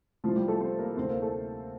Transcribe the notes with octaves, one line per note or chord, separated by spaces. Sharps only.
C2 C3 F3 G3 F4
G3 G4
A3 A4
C4 C5
A#3 A#4
D2 C3 D#3 A3 C4 C5
A#3 A#4
A3 A4